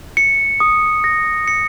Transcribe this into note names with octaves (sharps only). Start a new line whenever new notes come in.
C#7
D#6
A#6
C#7